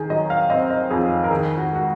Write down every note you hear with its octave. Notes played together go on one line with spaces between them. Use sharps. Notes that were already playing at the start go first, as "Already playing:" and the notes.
Already playing: D#3 G#4
F#3 D#5
F5
C4 D#5
D#5
F2 G#4
A#4
D#3 G#4
F#4
G#3 F#4